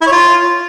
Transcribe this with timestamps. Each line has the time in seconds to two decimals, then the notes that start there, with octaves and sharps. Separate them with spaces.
0.02 E4
0.07 C#5
0.12 F4